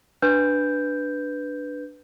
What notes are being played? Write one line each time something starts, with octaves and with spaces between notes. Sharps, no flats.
D4 B4 G6